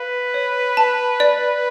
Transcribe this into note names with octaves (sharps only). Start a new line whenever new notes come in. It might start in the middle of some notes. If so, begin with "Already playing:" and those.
Already playing: B4 F5
C#5
A5
D5